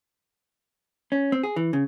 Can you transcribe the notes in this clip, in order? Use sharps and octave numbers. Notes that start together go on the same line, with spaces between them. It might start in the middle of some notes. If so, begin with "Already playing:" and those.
C#4
C4
G#4
E3
C#3